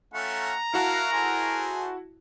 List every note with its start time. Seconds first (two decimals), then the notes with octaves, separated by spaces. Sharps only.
0.14 A3 C#4 F4 F#5 A#5
0.74 E4 F#4 A#4 F5 F#5 A5
1.13 G#4 A4 C5